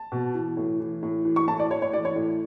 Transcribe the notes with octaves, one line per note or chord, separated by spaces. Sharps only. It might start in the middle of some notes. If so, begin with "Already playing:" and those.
Already playing: A5
B2
E3
A2
E3
A2
E3
C#6
A2 A5
D5
A2 C#5
C#5
E3 D5
C#5
A2